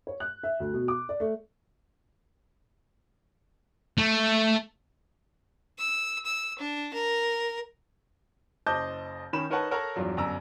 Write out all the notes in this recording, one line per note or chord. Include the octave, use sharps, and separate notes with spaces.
C#5
F#6
E5
D2
B2
D6
D5
A3
A3
E6
E6
D4
A#4
F#1 C5 D#5 A5 D6 G6
D#3 C#4 B5 E7
D#4 A#4 B4 C#5 F#5 A5
A4 A#4 C#5 F#5 A#5
E2 G2 F3 F#3
G1 F#2 A#5 E6